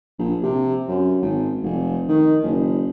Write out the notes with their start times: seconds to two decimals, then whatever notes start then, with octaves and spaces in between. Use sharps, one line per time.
0.19 A#1
0.43 C3
0.88 F#2
1.22 G#1
1.63 F1
2.08 D#3
2.43 F#1